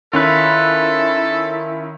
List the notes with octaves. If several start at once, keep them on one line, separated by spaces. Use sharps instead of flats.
D#3 C#4 E4 F4 A4 B4